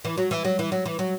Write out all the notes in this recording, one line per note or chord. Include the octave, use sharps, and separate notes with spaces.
E3
F#3
E3
F#3
E3
F#3
E3
F#3